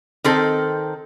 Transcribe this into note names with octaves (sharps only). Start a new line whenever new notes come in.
D#3 C4 A4